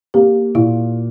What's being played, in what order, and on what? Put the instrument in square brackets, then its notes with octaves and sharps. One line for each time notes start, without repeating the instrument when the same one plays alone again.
[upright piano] A#3 [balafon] G4
[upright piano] A#2 [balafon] E4